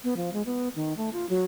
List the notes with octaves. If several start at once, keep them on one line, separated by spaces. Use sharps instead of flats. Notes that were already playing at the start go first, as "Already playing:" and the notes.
B3
F3
G#3
B3
D#3
A3
F4
F#3